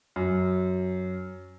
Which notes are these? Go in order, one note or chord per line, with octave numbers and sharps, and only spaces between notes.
F#2